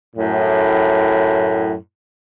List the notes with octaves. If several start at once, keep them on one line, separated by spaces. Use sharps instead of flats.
F#2 A2